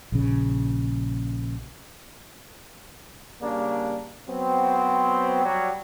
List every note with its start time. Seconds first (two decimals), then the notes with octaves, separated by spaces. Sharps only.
0.12 A#1 C#3
3.40 C#3 G3 A#3 D4
4.28 F#3 B3 C4
5.44 F#3 G3